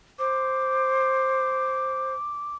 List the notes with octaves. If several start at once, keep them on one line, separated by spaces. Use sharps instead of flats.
C5 D6